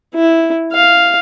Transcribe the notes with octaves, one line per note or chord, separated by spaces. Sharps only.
E4
F5